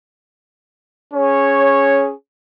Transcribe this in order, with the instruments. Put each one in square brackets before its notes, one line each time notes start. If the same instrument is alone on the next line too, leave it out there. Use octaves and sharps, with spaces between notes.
[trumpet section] C#4 G#4 C#5